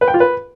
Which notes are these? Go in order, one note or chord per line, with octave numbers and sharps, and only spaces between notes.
B4
G5
F4
B4